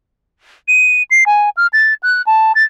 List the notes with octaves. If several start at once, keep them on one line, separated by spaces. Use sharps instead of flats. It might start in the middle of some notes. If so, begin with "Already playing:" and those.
D#7
C7
G#5
F6
A6
F#6
A5
A6